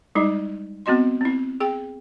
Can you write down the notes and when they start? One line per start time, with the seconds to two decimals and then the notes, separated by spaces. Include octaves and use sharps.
0.15 G3 G#3 D#4 E4
0.86 B3 C4 F#4 D#5 C6
1.21 C4 E4
1.60 G#4 G5